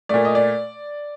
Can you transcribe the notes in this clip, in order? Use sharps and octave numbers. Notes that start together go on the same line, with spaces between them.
A#2 A3 D5
D#5
D5